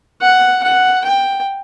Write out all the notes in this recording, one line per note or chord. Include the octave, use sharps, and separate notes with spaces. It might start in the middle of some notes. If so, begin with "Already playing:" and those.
F#5
F#5
G5